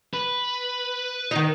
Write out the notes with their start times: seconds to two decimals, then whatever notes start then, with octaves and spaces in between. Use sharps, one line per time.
0.14 B4
1.31 D#3 D#4